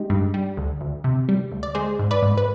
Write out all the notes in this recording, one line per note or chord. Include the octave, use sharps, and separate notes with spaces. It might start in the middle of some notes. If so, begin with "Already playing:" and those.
Already playing: G#3 D#4 G4
G2
G3
D2
D2
C3
G3
D2
D5
G#3 G#4 C5
G#2
B4 D5
G#2
B4